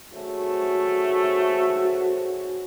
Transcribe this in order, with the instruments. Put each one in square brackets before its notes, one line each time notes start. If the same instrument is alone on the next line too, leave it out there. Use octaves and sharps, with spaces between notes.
[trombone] A3 [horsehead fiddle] F#4 [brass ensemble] G#4 C5 C#5